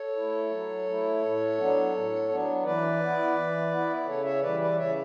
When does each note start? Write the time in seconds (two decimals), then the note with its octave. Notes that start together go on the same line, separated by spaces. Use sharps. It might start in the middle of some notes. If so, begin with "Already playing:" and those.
Already playing: A4 C#5
0.16 A3 E4
0.51 F#3
0.87 A3 E4
1.22 A2
1.58 F#3 B3 D4
1.93 A2
2.29 F#3 B3 D4
2.64 E3 B4 D5
3.00 B3 E4
3.35 E3
3.71 B3 E4
4.06 C#3 A4 C#5
4.24 C#5 E5
4.42 E3 G3 B4 D5
4.60 B4 D5
4.77 C#3 C#5 E5